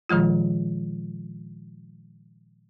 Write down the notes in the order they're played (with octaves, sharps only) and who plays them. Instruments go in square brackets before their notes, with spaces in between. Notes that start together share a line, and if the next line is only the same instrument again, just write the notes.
[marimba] A#2 D#3 F3 G#3 F4